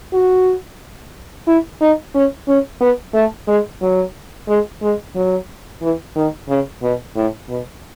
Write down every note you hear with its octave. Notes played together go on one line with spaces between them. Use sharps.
F#4
E4
D#4
C#4
C#4
B3
A3
G#3
F#3
G#3
G#3
F#3
E3
D#3
C#3
B2
A2
B2